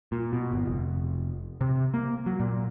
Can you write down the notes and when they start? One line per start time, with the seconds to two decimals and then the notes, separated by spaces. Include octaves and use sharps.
0.12 A#2
0.33 B2
0.52 G1
0.66 F1
1.61 C3
1.94 A#3
2.26 F#3
2.40 A#2